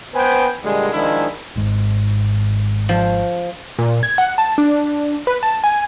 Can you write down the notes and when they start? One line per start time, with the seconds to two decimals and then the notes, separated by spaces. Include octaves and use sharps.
0.15 B3 B4 C5 G5 G#5
0.64 A#2 D3 G3 G#3
0.93 D#3 F3 G#3 D4 E4
1.56 G#1 G#2
2.89 F3
3.79 A#2
4.03 G#6
4.18 F#5
4.38 A5
4.58 D4
5.27 B4
5.43 A5
5.64 G#5